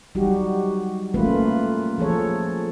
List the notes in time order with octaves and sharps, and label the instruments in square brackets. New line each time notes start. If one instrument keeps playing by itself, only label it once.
[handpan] F#3 G3 D#4 F#4 G4
A3 A#3 C#4 F4 B4
F3 G#4 A4 C#5